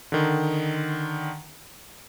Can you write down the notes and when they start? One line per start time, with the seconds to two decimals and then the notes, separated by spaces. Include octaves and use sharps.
0.12 D3 D#3